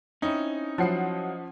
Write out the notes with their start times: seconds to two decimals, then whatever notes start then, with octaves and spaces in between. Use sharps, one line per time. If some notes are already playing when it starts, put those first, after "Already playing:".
0.22 C4 C#4 D#4 E4
0.78 F3 F#3 E4 F#5 C7